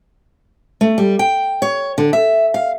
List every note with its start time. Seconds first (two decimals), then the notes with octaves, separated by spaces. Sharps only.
0.81 A3
0.98 G3
1.19 G5
1.62 C#5
1.98 D3
2.13 E5
2.54 F5